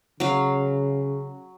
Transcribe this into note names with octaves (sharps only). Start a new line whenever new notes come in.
C#3 F#3 F5